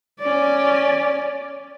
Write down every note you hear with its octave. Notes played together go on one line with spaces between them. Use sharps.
C#4 D5